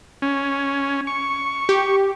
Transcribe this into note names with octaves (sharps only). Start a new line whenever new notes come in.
C#4
C#6
G4